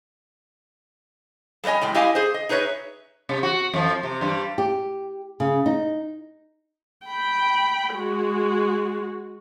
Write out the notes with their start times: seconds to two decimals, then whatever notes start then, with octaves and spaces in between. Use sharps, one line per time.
1.64 G3 A3 C#5 D#5 G#5
1.82 A2 G3 G#3
1.94 E4 G4 D#5 F5 G#5
2.15 G#4 C5
2.34 D#5
2.49 D#4 G#4 B4 C#5 E5
3.29 C3
3.43 F#4
3.74 F2 F3
4.03 C3
4.21 G2 G3
4.58 G4
5.40 C#3
5.66 D#4
7.07 G5 B5
7.95 G#3 F#4